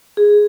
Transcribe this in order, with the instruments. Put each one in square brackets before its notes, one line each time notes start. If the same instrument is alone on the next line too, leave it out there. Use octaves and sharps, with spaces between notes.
[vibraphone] G#4